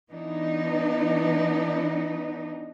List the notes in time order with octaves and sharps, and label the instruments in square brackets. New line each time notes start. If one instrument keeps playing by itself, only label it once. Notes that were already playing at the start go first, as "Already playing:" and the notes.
[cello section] E3 B3 D4 D#4